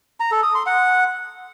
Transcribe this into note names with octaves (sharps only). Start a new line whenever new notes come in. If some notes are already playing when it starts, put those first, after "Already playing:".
A#5
A4
D#6
C6
F#5